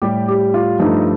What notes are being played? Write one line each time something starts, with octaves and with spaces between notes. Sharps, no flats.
A2 G3 G4
G4
F4
G2 F3 A3 D#4